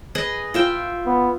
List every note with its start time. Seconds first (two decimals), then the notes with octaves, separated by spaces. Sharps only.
0.15 G#4 B4 D#5
0.54 F4 E5 G5
1.06 B3